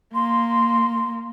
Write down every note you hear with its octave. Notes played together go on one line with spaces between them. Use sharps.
A#3 C6